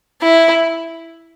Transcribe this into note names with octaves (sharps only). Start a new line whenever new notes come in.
E4